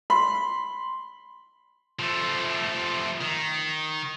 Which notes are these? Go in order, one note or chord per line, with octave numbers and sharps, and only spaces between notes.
B5 C6
F3 A3
D#3